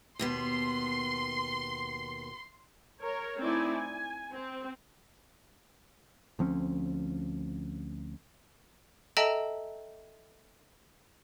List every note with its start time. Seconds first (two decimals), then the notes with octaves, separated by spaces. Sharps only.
0.19 D#2 B2 B3 C6
3.02 A#4 C#5
3.39 A3 C4 D#4 E4 D5 G#5
3.76 G#5
4.33 C4
6.39 D2 F3 C4 C#4
9.17 A4 D#5 E5 G5 A5 A#5